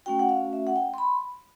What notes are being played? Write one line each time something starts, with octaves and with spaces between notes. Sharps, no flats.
A3 C#4 F#4 G5
F#5
F5
E5
F#5
G5
C6
B5